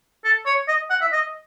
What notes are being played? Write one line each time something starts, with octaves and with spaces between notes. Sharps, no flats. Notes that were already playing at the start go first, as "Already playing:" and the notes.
A4
C#5
D#5
F#5
E5
D#5